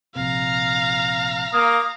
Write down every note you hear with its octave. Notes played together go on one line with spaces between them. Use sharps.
A#1 C3 F5 A#5
A#3 D#6